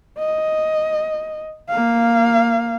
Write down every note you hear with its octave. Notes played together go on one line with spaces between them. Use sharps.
D#5
A#3 F5